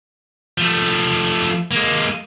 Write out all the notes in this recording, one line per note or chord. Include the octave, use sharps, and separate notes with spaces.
F3 A3
G#3 A#3